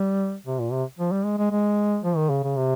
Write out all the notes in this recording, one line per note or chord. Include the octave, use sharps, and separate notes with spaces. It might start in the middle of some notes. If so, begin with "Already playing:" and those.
Already playing: G3
C3
A#2
C3
F3
G3
G#3
G#3
G#3
F3
D#3
C#3
C#3
C3